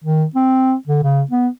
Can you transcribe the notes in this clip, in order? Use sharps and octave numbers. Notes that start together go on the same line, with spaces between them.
D#3
C4
D3
C#3
B3